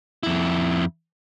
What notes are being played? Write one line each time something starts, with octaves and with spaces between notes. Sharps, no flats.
F2 E4